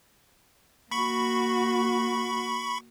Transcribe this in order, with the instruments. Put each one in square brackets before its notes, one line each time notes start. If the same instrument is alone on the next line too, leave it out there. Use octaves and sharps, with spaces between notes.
[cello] A#3 F#4 [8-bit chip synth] B5 C#6